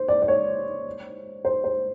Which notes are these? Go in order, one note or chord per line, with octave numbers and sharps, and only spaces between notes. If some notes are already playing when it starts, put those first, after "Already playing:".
Already playing: C5
D5
D5
C#5
C5
C5